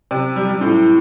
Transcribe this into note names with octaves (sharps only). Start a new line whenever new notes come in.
C3
G3
G3
A2